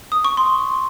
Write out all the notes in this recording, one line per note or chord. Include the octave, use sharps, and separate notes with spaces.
D#6
C#6
C6